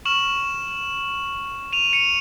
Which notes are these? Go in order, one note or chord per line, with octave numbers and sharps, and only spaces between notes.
C#6 F6 E7 F#7
D#7 F7
C#7 D#7